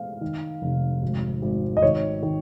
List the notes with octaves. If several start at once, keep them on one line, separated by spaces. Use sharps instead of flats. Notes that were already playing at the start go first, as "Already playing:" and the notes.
Already playing: F5
D#3
F1
G#1
G#1
D#5
D#3 C#5
D#3